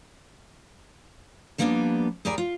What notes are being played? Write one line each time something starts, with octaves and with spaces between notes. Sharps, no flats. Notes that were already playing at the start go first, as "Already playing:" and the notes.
F3 G3 A#3 B3 C#4 D4
D#2 G3 G#4 A#4 D5
F4